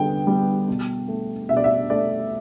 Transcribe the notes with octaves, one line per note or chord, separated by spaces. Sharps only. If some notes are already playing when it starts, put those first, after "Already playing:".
Already playing: D3 G3 B3 G5
G3 B3
B2
A3
B2 E5
D5
E5
A3 D5